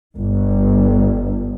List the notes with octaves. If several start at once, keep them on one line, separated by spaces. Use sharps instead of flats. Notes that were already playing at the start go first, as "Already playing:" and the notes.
G1